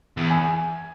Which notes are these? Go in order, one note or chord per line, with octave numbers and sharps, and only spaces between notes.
E2
G#5